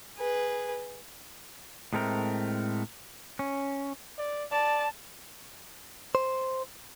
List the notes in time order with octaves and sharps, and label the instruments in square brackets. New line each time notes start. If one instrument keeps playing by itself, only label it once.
[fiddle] G#4 B4
[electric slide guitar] A2 G#3 A3 C4 A#4
C#4
[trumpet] D5
[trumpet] D5 [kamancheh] A5
[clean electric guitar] C5